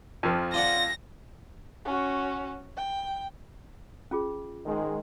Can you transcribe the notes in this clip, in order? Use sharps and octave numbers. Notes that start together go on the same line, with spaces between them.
F2 F3
F4 D5 F#5 A#6
C#4 F#4
G5
C#4 F4 G#4
G#2 D#3 G#3